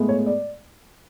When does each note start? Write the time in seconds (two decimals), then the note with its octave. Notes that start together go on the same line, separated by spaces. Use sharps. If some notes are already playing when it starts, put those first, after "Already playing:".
Already playing: A2 G#3 B3
0.09 C#5
0.26 D5